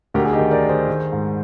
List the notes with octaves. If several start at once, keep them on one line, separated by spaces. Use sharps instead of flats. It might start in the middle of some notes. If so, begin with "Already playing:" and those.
D2 G4 A#4
G#4
D#4 G4
D#3
A#4 D5
D#3
G#4 C5
D#3
G#2